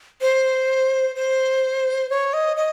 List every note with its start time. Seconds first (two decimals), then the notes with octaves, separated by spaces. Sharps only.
0.21 C5
1.16 C5
2.10 C#5
2.33 D#5
2.57 D#5